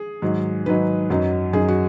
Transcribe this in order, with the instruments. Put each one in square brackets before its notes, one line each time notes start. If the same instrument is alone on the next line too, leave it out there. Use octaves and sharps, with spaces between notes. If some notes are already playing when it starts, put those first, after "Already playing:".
Already playing: [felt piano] G#4
G#2 D#3 F#3 D#4
G#2 D#3 F#3 D#4 B4
F#2 F#3 D#4
F#2 F#3 D#4 G#4
F#4